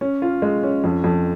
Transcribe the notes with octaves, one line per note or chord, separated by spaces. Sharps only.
C#4
F4
G#3
C#4
F2
F2